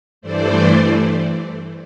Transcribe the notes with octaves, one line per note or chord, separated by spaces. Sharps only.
G2 E3 A3 C5 D5